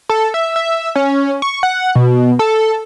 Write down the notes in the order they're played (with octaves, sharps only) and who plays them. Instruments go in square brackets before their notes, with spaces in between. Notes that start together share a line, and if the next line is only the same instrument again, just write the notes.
[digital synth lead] A4
E5
E5
C#4
C#6
F#5
B2
A4